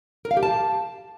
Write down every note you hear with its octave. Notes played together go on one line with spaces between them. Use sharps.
A#4
F5
G4
A5